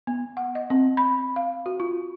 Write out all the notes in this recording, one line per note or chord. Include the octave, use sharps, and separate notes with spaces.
B3
F#5
D#5
C4
B5
F5
F#4
F4